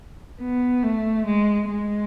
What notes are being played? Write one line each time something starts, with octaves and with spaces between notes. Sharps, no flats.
B3
A3
G#3
G#3